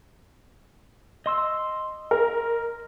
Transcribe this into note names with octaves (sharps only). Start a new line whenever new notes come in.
D#5 C6 E6
A#4